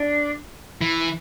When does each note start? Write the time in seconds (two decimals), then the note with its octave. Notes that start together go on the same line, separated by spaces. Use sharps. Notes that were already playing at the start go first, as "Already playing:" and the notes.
Already playing: D4
0.81 E3